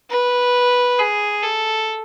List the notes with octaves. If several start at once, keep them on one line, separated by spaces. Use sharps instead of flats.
B4
G#4
A4